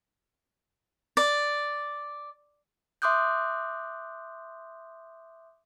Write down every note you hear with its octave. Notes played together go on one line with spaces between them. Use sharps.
D5
E5 C6 D6 D#6 F#6 G6